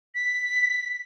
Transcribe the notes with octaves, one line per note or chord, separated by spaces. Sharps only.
B6